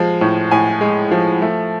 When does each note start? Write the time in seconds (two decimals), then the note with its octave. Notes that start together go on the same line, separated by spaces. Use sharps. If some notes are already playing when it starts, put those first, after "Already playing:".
Already playing: F3 G#3
0.21 A2
0.51 A2 G#5
0.81 G#3
1.11 F3
1.42 A3